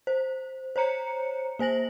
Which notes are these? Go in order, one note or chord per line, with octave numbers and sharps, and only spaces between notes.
C5
C5 C#5 A#5 C#7
A#3 C5 G#5 A#6 F#7